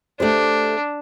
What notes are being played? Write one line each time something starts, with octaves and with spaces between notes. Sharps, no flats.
A3 D4 G4 C5